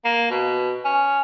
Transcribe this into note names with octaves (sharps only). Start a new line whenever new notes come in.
A#3
B2
C#4